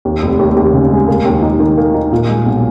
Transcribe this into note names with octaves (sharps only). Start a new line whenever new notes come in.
D#2
F1
D#2
D#2
C#3
G#3
A#3
D#2
D#4
D#3
A#3
D#4
A#2
G#3
B1